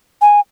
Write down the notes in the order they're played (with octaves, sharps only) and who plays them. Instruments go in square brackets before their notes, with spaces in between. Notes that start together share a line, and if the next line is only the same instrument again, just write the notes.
[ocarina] G#5